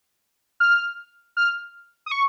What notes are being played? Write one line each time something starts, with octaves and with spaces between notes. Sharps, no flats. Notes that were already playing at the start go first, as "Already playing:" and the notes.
F6
F6
D#6
C#6